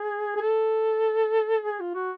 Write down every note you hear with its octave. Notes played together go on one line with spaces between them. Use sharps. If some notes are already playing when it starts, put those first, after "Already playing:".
Already playing: G#4
G#4
A4
G#4
F4
F#4